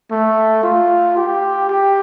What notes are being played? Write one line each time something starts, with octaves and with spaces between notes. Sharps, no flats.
A3
F4
G4
G4